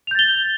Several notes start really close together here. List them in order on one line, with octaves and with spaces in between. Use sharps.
F7 G6 A6 G7